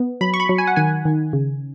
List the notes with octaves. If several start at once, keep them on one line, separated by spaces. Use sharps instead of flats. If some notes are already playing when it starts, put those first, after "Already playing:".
Already playing: B3
F#3 B5
C#6
B5
F#3
G#5
F#5
D#3 G#5
D#3
C#3